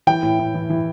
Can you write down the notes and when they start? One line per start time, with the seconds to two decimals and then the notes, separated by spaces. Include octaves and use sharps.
0.07 E3 G5
0.23 A2
0.39 A2
0.54 E3
0.70 E3